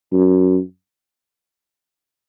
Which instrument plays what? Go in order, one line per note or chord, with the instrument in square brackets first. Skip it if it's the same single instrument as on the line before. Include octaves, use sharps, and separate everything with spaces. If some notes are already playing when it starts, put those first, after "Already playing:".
[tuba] F#2